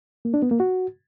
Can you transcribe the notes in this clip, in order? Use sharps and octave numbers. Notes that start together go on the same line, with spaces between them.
A#3
D4
B3
A#3
F#4